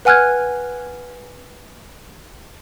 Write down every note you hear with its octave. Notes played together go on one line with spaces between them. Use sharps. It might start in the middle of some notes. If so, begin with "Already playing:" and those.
B4 F#5 G#5 F6 F#6 G#6